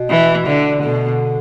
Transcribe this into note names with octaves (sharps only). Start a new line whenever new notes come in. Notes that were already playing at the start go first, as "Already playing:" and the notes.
Already playing: B2
E3
D3
B2 D3